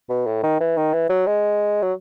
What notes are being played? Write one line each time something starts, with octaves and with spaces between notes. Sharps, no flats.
B2
A2
D#3
E3
D#3
E3
F#3
G#3
F#3